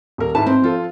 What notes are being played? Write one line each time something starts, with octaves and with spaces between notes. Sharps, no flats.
D#1 A#4
G#2 E4 B4 A5
C4
F3 F4 A4